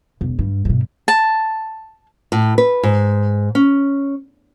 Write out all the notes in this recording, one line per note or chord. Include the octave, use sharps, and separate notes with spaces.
E1
G2
G2 B2
A5
A2
B4
G#2
C#4